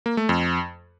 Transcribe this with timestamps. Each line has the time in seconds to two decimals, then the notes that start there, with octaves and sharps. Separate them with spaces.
0.06 A#3
0.17 A3
0.29 F2